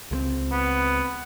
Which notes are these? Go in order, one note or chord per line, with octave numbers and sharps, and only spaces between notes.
C#2 G#3 C4
B3